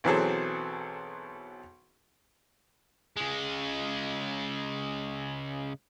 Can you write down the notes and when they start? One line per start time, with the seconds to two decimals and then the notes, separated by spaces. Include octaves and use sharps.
0.04 B1 E3 F#3 C4 G#4 A4
3.17 C#3 G#3